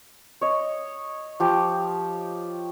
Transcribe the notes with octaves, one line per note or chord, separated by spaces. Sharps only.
C#5 D#5
F3 G4